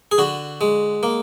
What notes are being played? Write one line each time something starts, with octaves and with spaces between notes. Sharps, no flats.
G#4
D3 F#4
G#3
A#3